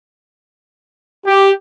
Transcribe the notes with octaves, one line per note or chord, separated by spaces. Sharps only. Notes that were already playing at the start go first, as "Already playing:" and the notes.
G4